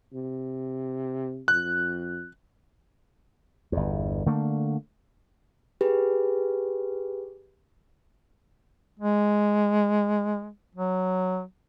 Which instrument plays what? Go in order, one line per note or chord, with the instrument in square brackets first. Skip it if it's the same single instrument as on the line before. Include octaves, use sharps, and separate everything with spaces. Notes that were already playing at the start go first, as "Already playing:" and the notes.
[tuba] C3
[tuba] F2 [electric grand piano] F#6
[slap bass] G1 E2
D3 A3 A#3
[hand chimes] G4 G#4 B4
[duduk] G#3
F#3